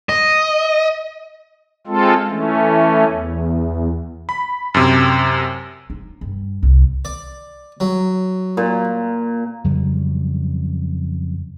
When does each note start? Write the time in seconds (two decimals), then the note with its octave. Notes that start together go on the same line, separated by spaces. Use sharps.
0.09 D#5
1.87 G#3 C4 F4 A4
2.30 E3 A3 C#4
3.11 E2
4.29 B5
4.74 F#2 C3
5.90 D#4
6.21 G2
6.63 C2
7.05 D5
7.80 F#3
8.57 A#2
9.64 F2 C#3 F#3 G3